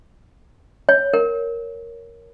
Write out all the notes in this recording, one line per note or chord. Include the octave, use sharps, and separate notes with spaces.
C#5
A#4